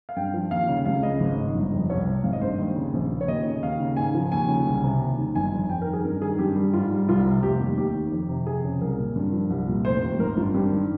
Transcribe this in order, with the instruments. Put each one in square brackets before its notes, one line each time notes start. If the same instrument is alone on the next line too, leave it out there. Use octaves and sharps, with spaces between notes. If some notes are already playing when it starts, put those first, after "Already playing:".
[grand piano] F5
G2 G5
F3
D#2 F5
C#3
C#2 F5
C#3 D#5
G#1
G#2
G1
F2
C2 C#5
C3
G#1 F5
D#5
G2 C5
D#2
C#3
A#1
A#2
C#5
D#2 D#5
C#3
D#2 F5
C#3
G#2 G#5
F3
D#2 G#5
C#3
C2
C3
D#2
D#3
G1 G#5
F2
F2 G5
A#4
D#3
G#4
G2 A#4
D#3 G#4
G2 G4
G3
G#2 F4
G3
C2 F4
C3
F1 G4
D#2
D#2 G4
D#3
F2
C3
F2 G#4
C#3
C2 A#4
A#2
G2
F3
C2
A#2
F1 C5
D#2
G#1 A#4
G2 F4
G2 G4
D#3